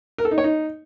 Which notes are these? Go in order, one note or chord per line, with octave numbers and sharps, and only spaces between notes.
A#4
A4
D#4
C#5
D#4